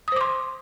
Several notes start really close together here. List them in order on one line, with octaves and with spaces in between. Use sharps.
D#6 C5 D6 C6